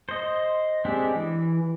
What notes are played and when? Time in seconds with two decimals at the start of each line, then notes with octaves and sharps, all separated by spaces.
0.09 C5 D#5
0.85 G#3 C4 D4 G4
1.15 E3